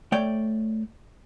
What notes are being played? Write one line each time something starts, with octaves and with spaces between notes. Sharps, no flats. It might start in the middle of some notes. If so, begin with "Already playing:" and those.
A3 C#5 D5 G5